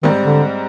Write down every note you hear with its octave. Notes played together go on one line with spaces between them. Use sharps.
G#2 D#3 G3 C4
D3